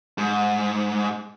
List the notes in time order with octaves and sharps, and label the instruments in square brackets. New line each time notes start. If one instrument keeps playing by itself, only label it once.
[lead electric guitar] G#2